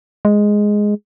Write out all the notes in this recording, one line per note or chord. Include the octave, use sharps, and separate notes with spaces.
G#3